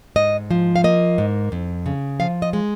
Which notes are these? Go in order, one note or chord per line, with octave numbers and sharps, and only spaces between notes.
G#2 D#5
F3
F5
A#3 D#5
G#2
F2
C#3
F3 F5
D#5
G#3